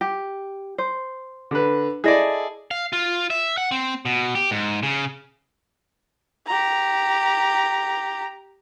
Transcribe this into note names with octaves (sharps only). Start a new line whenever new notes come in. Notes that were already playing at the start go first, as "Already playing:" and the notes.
G4
C5
D3 B4
E4 G#4 A4 D5 D#5
F5
F4
E5
F#5
C4
B2
G4
G#2
C#3
G4 A#5